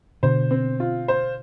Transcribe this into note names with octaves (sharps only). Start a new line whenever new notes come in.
B2 D3 C5
C4
F4
C5